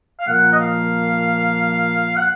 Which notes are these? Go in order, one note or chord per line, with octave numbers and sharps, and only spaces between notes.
F5
A#2 F3 A#3 F#5
D#5
F5
F#5